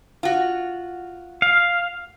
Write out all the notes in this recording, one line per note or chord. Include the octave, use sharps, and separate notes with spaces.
F4 F#4
F5